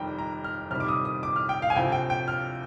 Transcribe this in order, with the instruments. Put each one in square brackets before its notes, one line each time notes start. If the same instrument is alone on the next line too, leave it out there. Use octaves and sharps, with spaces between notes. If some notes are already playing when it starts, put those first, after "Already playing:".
Already playing: [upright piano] F1 F2 D#3 G3 G5 A#5
A#5
F6
F2 C3 D#3 G3 F6
D6
D#6
D#6
D6
F6
G5
F5
G#5
D2 C3 F3 G5
G5
G5
F6